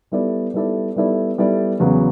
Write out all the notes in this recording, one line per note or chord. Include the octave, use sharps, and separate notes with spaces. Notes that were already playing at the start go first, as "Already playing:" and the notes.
G3 B3 E4 A4 D5
G3 B3 E4 A4 D5
G3 B3 E4 A4 D5
G3 B3 E4 A4 D5
E2 C#3 F#3 B3